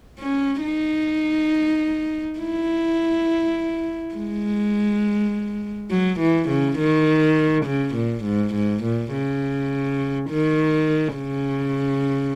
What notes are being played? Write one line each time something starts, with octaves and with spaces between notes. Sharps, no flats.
C#4
D#4
E4
G#3
F#3
E3
C#3
D#3
C#3
A#2
G#2
G#2
A#2
C#3
D#3
C#3